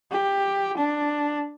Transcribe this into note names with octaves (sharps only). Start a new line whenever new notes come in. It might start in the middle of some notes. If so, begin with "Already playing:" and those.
G4
D4